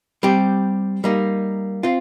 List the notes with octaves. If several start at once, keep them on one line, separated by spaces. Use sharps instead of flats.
G3 C4 G4
G3 A#3 D#4
C4 F4